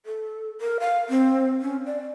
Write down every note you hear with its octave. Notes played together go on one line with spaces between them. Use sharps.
A4
A#4
F5
C4
C#4
D5